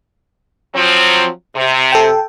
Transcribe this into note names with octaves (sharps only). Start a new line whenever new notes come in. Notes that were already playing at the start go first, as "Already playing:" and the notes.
F3 F#3 C4
C3
A4 G5